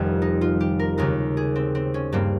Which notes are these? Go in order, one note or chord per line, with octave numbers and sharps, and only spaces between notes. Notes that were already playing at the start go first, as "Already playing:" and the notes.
Already playing: F1 F2 D#3 G3 F4 G4
D#4
F4
G4
A#4
D#2 C#3 G#3 A#4
G#4
C4
C4
C#4
G2 G3 A#3 C4